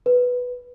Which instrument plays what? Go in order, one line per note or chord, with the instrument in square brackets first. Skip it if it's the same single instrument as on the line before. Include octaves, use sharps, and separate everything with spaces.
[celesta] B4